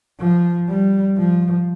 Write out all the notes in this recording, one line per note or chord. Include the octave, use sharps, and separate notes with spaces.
F3
G3
F3